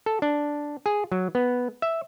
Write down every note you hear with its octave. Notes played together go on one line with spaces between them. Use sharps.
A4
D4
G#4
F#3
B3
E5